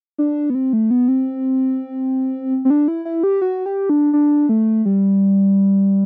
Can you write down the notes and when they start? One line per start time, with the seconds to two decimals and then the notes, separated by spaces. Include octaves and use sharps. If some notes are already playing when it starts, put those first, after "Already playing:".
0.18 D4
0.50 B3
0.55 C4
0.73 A3
0.91 B3
1.08 C4
2.65 C4
2.70 D4
2.88 E4
3.05 E4
3.23 G4
3.42 F#4
3.66 G4
3.90 D4
4.13 D4
4.49 A3
4.85 G3